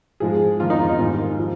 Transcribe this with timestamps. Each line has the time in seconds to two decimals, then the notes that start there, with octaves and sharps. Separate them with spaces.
0.20 G#2 F3 G#3 G#4
0.60 F2 D#3 A#3 F4
0.70 D#4
0.80 F4
0.90 D#4
0.99 G#2 D#3 G3 A#3 F4
1.39 F3